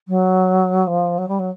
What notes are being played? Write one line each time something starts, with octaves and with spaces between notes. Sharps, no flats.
F#3
F3
F#3
G3
F#3